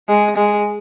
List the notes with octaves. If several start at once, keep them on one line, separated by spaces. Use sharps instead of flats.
G#3
G#3